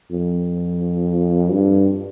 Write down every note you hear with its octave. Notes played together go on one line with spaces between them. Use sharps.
F2
G2